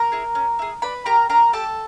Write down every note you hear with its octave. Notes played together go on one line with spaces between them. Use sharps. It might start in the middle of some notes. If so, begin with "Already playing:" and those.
Already playing: A#4 A#5
E4 G#4
C#4
E4 G#4
D4 B4 B5
G4 A#4 A#5
D4 A#4 A#5
G4 A4 A5